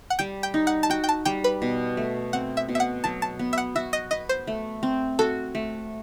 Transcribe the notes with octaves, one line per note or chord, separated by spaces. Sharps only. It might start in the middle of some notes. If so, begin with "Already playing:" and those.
F#5
G3 G5
G5
D#4
F#5
A5
F#4 G5
G5
A5
G3 G5
B4
B2
A3
C4 F#5
E5
B2
E5
F#5
F#3 A5
A5
B3
E5
F#5
F#4 E5
D#5
B4 D#5
C5
A3
C4
F#4 A4
A3